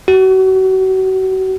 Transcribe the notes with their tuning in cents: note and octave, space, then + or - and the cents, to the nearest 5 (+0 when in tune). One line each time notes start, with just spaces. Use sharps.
F#4 +35